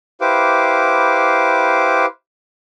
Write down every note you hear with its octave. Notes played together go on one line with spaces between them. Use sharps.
E4 G4 B4 C5 F5 D6